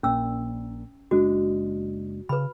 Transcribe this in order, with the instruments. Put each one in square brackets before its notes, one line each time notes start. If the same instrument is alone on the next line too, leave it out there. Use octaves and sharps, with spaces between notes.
[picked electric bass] A#1 A#2 [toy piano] C#4 E6
[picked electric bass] F#1 G#3 D4 [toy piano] F#4
[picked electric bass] C#3 [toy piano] B4 B5